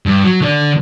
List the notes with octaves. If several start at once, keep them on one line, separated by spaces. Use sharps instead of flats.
G2
F#3
D3 D5